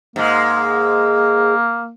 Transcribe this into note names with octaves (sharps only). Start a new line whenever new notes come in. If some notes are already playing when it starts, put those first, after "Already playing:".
G#2 G#3 A#3